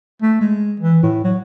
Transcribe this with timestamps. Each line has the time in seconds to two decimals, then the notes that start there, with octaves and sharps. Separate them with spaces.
0.22 A3
0.41 G#3
0.80 E3
1.03 A2
1.24 F#3